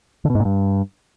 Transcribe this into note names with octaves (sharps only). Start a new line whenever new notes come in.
D3
B2
G#2
A#2
G2